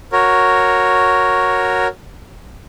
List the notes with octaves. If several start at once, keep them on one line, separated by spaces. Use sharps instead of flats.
F#4 A#4 C#5